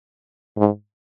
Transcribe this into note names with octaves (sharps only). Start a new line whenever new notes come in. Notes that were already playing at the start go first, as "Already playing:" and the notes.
G#2